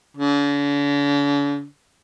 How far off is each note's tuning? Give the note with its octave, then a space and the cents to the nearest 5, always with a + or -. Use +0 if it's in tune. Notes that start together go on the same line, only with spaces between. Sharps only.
D3 -45